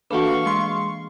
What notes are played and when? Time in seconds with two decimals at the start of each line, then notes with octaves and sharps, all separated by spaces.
0.11 E3 A#3 D4 F#4 A4 B4 F5 C#6
0.46 G#3 C6